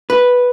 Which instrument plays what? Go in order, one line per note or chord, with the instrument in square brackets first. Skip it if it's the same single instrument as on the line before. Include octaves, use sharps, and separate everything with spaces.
[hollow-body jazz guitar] B4